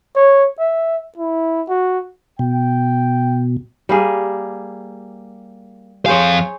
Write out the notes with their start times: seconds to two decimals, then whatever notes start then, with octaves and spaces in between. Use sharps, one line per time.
0.16 C#5
0.59 E5
1.18 E4
1.69 F#4
2.39 B2 G5
3.89 G3 A#3 G#4
6.06 F2 G#4 C5 C#5 F5